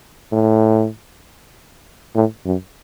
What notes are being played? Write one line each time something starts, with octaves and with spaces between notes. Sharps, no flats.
A2
A2
F#2